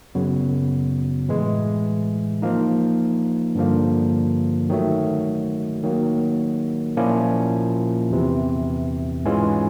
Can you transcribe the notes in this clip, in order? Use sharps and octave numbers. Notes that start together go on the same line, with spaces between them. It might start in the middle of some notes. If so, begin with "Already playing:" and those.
F#2 C#3 F#3 B3
A2 E3 G#3
F3 A#3 D#4
G2 D3 F3 A#3
D#3 F#3 A3
D#3 F#3 A#3
A#2 F3 A#3 C#4 E4
E2 C3 E3
G#2 E3 G#3 C#4 F4